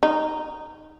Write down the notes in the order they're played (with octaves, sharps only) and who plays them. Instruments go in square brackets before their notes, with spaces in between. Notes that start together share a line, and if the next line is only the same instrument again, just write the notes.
[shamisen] D#4